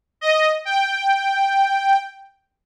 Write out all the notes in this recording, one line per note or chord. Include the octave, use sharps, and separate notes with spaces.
D#5
G5